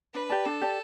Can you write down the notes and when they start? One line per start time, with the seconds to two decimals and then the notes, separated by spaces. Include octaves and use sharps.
0.14 D4 B4
0.29 G4 D5 A5
0.45 D4 A4
0.61 G4 D5 A5